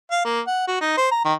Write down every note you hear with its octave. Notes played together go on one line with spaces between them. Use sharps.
F5
A#3
F#5
F#4
D#4
C5
A#5
D#3